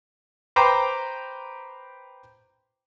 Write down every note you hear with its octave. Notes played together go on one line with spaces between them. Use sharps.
B4 C5 G5 A#5 D6